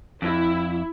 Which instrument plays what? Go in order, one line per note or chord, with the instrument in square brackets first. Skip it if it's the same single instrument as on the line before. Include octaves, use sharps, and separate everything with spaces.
[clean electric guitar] F2 [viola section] E4